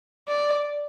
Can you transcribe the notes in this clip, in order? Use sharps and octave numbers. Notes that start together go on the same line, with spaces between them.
D5